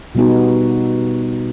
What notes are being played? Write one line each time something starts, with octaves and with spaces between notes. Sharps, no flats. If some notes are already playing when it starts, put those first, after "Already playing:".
B2 G3 B3 D#4 F#4